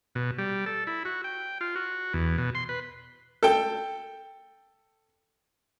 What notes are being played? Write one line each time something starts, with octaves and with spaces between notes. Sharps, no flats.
B2
G3
A4
E4
F#4
G5
F4
F#4
E2
B2
C6
B4
A4 G5